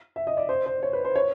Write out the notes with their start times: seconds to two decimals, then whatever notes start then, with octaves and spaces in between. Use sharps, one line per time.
0.16 E5
0.27 D#5
0.37 D5
0.49 C5
0.66 C5
0.83 C#5
0.93 B4
1.05 C5
1.16 C#5